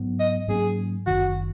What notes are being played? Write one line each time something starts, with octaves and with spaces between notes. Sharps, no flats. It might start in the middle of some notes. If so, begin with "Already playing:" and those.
Already playing: G#2 F#3 B3
D#5
G#2 F#3 A#3 C#4 G#4
F#1 F#2 D#3 F#4